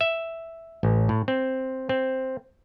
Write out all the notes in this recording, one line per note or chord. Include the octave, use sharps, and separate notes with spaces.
E5
A1
A2
C4
C4